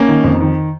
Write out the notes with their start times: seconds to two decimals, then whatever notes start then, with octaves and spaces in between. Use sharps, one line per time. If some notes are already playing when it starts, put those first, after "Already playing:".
Already playing: A#3 C#4
0.08 D#3
0.24 F2
0.40 D#3